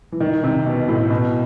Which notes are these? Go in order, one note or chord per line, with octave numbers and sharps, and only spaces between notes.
E3
D#3
C3
B2
A2
B2